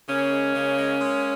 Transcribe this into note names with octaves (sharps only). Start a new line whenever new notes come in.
C#3 A#3 C#4
G#3
C#3
G#3
G#3